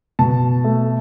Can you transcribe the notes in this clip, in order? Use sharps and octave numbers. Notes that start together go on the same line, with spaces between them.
B2 A5
A3